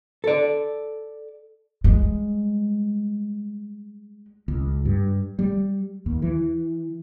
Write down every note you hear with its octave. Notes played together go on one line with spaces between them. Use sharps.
A4 D5
G3 G#3
C#2
G2
G3
D#2
E3